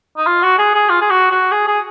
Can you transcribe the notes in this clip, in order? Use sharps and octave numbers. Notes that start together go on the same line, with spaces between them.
D#4
F4
F#4
G#4
G#4
F4
G#4
F#4
F#4
G#4
G#4